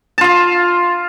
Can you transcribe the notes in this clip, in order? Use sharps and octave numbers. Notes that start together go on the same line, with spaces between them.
F4 F5 A5